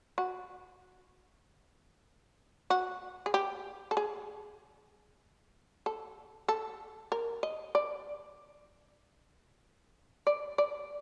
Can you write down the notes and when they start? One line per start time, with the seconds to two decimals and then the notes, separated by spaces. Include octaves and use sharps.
0.18 F#4
2.70 F#4
3.26 G#4
3.34 G4
3.91 A4
3.97 G#4
5.86 A4
6.48 A4
7.12 A#4
7.43 D#5
7.75 D5
10.27 D5
10.58 D5